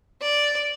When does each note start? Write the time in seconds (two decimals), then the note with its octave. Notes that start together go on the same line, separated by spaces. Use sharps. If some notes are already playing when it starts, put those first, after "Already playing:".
0.22 D5